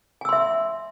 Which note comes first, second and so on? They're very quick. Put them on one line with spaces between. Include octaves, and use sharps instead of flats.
G#5 E6 C6 E5